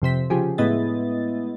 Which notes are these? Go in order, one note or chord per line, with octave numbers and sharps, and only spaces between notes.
F2 C3 C5 B6
C#3 F3 G4 G#4
A2 G#3 B3 E4 D#5 A6